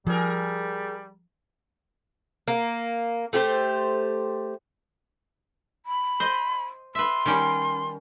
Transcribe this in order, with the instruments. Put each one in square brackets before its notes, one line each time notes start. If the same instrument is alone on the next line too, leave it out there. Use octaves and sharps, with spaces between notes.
[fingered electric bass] F3 [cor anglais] G3 [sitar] G#4 A#4
[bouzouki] A#3
A3 G4 C5
[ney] B5
[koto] C5 D#5
[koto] B4 E5 [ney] C6
[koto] D#3 G3 C#4